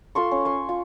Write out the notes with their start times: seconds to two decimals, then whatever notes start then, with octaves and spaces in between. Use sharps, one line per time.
0.15 F4 A4 C6 C#6
0.31 C#4
0.45 G#5 C6 C#6
0.69 F4